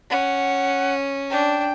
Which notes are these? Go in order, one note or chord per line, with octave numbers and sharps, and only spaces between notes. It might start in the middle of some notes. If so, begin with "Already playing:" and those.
C#4 F#5
D4 G5